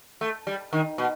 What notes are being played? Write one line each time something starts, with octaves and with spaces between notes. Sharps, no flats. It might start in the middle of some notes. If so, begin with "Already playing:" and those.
A3
G3
D#3
B2